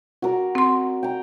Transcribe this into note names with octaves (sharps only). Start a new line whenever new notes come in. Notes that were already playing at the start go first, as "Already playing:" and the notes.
F#4 A#4 D5
C4 C6
G5 A#5